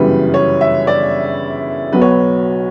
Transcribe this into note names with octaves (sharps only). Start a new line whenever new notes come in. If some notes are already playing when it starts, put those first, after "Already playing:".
Already playing: G1 F#2 C#3 E3 G3 B4
C#5
E5
D5
B1 B2 F#3 B4
C#5
B4